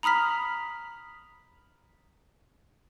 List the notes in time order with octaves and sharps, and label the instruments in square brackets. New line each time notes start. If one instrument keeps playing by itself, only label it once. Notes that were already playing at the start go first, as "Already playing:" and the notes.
[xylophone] A#5 B5 D#6 F6 B6